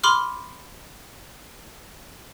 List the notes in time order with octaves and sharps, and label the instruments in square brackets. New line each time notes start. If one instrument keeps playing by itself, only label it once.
[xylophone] B5 C6 D6 F6